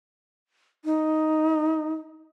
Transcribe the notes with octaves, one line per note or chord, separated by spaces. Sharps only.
D#4